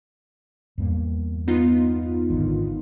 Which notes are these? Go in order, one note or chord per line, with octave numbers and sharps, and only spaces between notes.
E2 G2 A#3
B3 D#4 F4
G#1 D3 D#3